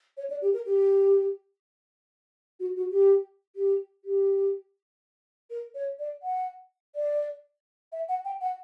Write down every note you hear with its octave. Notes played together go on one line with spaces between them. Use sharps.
C#5
D5
G4
A#4
G4
F#4
F#4
G4
G4
G4
A#4
C#5
D5
F#5
D5
E5
F#5
G5
F#5